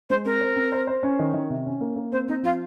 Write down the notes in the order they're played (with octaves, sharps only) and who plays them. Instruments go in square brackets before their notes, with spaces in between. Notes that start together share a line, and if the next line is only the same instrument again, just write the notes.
[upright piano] G#3 [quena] C5
[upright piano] C4 [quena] A#4
[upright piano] C5
C4
C5
C5
C#4
D#3
D#3
C3
C#4
A#3
A#3
[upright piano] C4 [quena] C5
[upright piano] C4 [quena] D#4
[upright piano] F3 [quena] F4